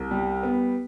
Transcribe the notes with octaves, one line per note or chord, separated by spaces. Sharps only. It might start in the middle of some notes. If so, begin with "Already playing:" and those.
Already playing: C2
G3
B3